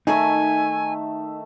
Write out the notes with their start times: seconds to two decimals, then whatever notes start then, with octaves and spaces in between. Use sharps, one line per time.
0.07 D#3 A3 D#4 E5 G#5